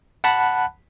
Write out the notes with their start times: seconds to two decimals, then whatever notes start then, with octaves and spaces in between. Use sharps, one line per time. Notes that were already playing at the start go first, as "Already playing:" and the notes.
0.24 F#5 A5 B5 F#6